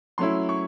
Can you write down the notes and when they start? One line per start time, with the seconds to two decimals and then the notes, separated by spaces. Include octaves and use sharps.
0.18 F#3 A3 C#4 E4 C6
0.49 C#6